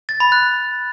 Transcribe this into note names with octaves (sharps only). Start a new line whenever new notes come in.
A6
B5
F#6